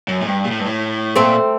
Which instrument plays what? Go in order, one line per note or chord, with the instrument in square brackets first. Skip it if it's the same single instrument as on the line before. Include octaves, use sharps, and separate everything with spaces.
[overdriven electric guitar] F#2
A2
G2
A#2
A2
G2
A2
[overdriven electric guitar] A#2 [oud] A3 C4